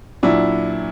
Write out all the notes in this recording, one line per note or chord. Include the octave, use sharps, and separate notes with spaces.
A#2 F#3 D4 E4